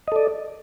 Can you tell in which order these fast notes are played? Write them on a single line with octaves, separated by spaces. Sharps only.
D#5 A4 D5